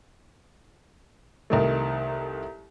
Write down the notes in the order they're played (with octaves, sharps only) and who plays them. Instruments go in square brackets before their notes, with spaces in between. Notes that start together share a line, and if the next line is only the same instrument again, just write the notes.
[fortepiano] C2 D#3 A3